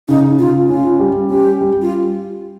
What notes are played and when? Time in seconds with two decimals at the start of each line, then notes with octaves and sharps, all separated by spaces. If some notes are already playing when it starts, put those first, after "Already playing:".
0.08 C#3 D#4
0.39 C#3 F4
0.69 C#4 F4
0.99 G3
1.30 C#4 G4
1.61 G3
1.82 F4